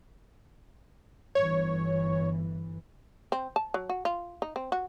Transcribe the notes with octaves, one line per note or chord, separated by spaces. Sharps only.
G1 E3 C#5
C4
A5
F#3
F#4
F4
D#4
C4
F#4